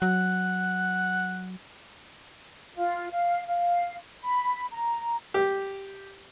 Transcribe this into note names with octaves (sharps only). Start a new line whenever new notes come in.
F#3 F#5
F4
F5
F5
B5
A#5
G4